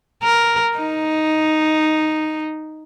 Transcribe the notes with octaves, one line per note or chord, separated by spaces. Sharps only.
A#4
D#4